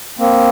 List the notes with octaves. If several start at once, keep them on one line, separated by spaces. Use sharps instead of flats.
A#3 C4